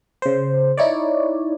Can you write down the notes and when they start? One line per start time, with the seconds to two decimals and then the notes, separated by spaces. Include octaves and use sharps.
0.22 C#3 C5
0.78 D#4 E4 C#5 D5